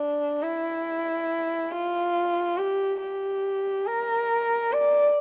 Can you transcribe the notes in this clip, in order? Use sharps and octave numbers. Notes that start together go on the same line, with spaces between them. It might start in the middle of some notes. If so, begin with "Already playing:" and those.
Already playing: D4
E4
F4
G4
G4
A#4
D5